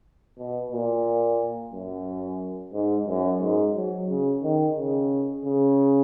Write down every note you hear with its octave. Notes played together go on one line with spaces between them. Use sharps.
B2
A#2
F#2
G#2
F#2
G#2
F#3
C#3
D#3
C#3
C#3